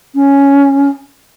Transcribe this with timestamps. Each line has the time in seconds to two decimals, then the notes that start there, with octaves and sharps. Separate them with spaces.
0.15 C#4